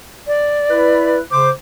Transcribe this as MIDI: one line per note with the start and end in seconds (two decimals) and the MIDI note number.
0.27 1.17 74
0.69 1.18 64
0.69 1.18 71
1.31 1.49 49
1.31 1.49 72
1.31 1.50 86